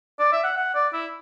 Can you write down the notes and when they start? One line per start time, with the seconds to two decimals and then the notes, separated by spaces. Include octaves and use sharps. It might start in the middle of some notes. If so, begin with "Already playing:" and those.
0.19 D5
0.32 E5
0.44 F#5
0.57 F#5
0.75 D5
0.93 E4